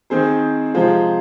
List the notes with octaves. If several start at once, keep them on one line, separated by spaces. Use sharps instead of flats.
D#3 C4 G#4 C5
C3 F3 G#3 F4 C5